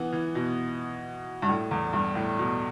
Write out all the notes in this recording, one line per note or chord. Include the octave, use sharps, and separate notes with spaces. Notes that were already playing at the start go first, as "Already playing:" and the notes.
Already playing: E3 B3
E3
B2
G2
A2
E2
G2
A2
B2